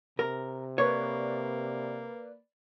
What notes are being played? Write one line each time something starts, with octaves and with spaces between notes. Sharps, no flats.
C3 A#4
A#3 B4 C#5 D5